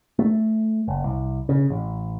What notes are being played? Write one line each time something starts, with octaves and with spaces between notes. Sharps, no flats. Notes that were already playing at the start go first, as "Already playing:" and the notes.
A3
F#1
C2
C#3
A1